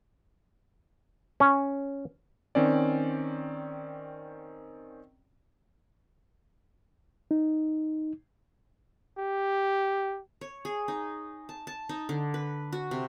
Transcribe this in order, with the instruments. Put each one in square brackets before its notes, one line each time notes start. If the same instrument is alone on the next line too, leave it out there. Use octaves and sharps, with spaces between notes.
[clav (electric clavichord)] C#4
[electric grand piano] D#3 C4 C#4 D5
[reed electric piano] D#4
[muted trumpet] G4
[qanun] C#5
G#4
D#4
A5
A5
D#4
D3
B4
F#4
C3